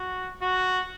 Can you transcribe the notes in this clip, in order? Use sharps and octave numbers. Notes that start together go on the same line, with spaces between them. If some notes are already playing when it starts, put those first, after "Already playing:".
Already playing: F#4
F#4